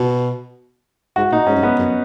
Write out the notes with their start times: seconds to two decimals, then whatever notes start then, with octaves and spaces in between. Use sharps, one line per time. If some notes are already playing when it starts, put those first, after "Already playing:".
Already playing: B2
1.16 G#2 F#4
1.32 A#2 D#4
1.47 G#2 C#4
1.56 F#2
1.62 G#2 B3
1.78 F#2